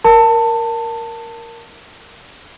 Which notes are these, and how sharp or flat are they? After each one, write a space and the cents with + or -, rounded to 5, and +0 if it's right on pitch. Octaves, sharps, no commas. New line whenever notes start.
A#4 +0 A5 +20